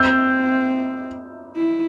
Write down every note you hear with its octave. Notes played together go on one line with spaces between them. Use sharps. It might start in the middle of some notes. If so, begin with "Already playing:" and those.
Already playing: C4 E6 G6
E4